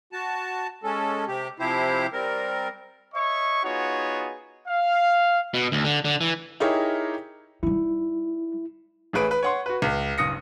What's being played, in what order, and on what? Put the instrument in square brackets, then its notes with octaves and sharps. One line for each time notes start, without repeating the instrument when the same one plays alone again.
[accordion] F#4 A5
G#3 C#4 A4
C3 G4
C3 F3 E4 G4 C5
G3 C4 A#4
[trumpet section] C#5 D#5 E5 C#6
B3 D#4 F4 F#4 G#4 C#5
F5
[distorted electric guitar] B2
D2
D3
D3
E3
[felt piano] D#4 E4 G4 G#4 A#4 C#5
[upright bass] G3 D#4 [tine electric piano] E4
[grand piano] A1 A3 G#4 B4 D7
B4
C#5 F#5 C6
F#4 B4
C#2
F#1 G2 D#6 A#6 C#7